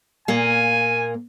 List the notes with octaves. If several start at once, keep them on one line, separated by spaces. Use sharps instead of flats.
A#2 A#3 G#5